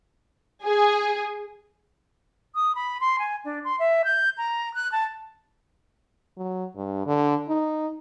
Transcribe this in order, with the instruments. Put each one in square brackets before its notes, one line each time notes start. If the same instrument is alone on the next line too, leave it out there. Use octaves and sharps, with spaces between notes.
[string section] G#4
[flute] D#6
B5
C6
G#5
D4
C6
E5
G6
A#5
F#6
A5
[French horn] F#3
G2
D3
D#4